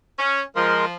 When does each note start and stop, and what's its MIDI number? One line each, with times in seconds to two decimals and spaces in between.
0.19 0.42 61
0.56 0.96 53
0.56 0.85 56
0.56 0.85 70
0.56 0.85 84